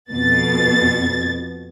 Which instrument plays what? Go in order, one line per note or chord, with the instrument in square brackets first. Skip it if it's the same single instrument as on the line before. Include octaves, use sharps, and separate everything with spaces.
[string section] F2 B2 A6